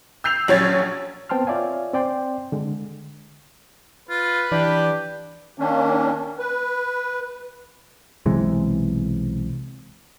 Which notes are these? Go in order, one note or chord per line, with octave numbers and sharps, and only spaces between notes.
E6 G6 C7 F7
A#1 F#3 C#4 C#5 G#6 A6
B3 C4 G5 A5 C6 F6
F4 C#5 D5 E5 F5 G#5
C4 D5 G5 C6
D3 G#3
F4 B4
E3 D4 G4
D#3 A#3 C#4 D4
B4
B1 C3 E3 G#3